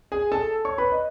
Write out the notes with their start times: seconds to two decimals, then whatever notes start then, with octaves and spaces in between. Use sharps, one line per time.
0.12 G#4 G#5
0.32 A4 A5
0.65 C#5 C#6
0.78 B4 B5
0.92 D#5